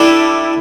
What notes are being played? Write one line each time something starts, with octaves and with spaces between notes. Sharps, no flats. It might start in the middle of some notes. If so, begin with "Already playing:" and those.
Already playing: G3 D4 E4 A4 D5